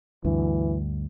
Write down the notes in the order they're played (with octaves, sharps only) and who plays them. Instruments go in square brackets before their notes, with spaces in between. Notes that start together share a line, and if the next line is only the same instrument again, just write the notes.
[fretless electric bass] D2 G2 [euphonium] E3